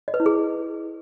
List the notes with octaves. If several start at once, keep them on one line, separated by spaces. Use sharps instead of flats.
D#5
B4
E4
G#4